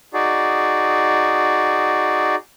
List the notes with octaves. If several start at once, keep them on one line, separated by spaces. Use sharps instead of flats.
D#4 F#4 G#4 D5